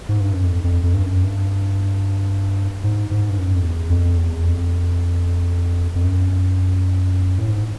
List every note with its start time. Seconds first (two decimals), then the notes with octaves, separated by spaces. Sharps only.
0.09 G#2
0.21 G2
0.32 F#2
0.43 F2
0.64 F2
0.83 F2
0.94 G2
1.04 F#2
1.24 G2
2.84 G#2
3.11 G#2
3.29 G2
3.38 F#2
3.55 F2
3.64 E2
3.90 F2
4.17 E2
4.43 F2
5.95 F2
6.04 F#2
7.38 A2
7.50 G#2